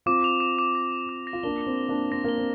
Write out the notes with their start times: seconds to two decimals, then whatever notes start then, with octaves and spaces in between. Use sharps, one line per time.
0.06 C4 F4 D6
0.24 F7
0.40 D6
0.59 D6
0.75 A#6
0.92 F7
1.09 D6
1.27 A#6
1.33 F4
1.43 A#3 D4 G7
1.61 G7
1.66 C4
1.77 G7
1.89 A#3 D4
1.95 G7
2.11 C4 A#6
2.24 A#3 G7
2.38 C4